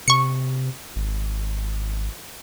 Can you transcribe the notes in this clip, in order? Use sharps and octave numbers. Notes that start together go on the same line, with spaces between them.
C3 C#6 C#7
G#1